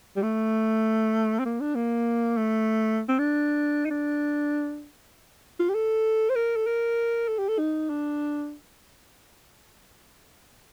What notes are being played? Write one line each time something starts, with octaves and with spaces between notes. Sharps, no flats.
G3
A3
C4
A#3
D4
A#3
A3
C4
D4
D#4
D4
F4
G4
A4
C5
A#4
A4
A#4
A4
G4
A4
D#4
D4